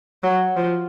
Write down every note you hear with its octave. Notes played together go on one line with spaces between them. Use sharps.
F#3
F3